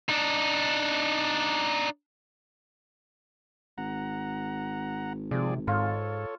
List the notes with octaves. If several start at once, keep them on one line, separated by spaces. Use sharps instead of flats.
D4 D#4
G#1 F#5 A#5
C3 F3 G#4 D5
G#2 F4 A4 C#5